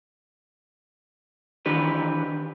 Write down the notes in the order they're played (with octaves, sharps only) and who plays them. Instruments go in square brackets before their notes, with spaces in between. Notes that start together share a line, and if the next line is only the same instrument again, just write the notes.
[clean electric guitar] D#3 E3 D4 G4 B4